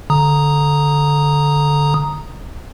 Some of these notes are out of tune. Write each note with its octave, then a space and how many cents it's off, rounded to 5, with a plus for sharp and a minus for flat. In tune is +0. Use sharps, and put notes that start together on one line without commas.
D3 -10 A#5 +0 D#6 +0